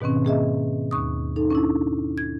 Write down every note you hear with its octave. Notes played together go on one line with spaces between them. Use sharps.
G#2 B2 D#3 C4 C#4
A#3 G#4 D#5 E5
D#2 C#6 D#6
D#4 A4
C#4 D4 E4
G#6